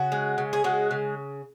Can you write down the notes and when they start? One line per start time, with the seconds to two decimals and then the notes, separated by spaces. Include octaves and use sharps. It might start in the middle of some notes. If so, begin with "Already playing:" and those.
Already playing: C#3 F#4
0.12 G#3
0.38 C#3
0.53 G#4
0.64 G#3 F#4
0.91 C#3